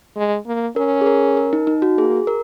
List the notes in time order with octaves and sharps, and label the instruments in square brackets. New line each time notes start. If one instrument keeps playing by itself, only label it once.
[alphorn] G#3
A#3
[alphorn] C#4 [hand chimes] A#4
[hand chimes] G#4
A#4
A#4
D#4
D#4
F#4
[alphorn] A#3 [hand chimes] G#4
[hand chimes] A#4